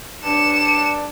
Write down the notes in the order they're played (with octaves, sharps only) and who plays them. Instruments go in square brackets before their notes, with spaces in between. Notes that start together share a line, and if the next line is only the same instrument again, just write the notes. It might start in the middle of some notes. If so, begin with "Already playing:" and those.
[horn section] G2 D4 [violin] C#7 E7